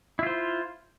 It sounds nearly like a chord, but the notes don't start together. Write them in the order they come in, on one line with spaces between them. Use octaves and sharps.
E4 F4 C5